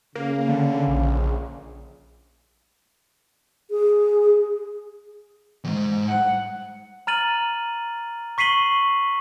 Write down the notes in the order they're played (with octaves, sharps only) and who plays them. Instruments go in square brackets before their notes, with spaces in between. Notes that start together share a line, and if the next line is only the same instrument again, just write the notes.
[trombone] C#3 [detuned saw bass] A#3
[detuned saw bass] D3
A#1
[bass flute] G#4
[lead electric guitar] E2 G#2
[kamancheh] F#5
[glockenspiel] A#5 F6 A6 D#7 F#7
C#6 B6 C7 D#7 F#7 G7